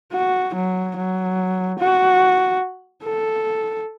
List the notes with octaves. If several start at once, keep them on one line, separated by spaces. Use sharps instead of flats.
F#4
F#3
F#3
F#4
A4